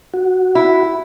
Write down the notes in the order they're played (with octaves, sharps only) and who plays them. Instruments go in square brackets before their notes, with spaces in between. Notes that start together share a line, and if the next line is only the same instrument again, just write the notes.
[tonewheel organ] F#4
[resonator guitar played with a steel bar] E4